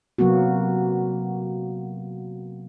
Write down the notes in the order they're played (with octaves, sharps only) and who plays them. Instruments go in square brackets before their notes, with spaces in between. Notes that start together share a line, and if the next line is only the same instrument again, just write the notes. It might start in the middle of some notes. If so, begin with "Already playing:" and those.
[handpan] C3 F#3 A#3 B3 F#4